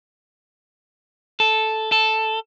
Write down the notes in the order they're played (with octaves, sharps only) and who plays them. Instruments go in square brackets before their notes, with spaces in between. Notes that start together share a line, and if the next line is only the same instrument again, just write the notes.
[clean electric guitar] A4
A4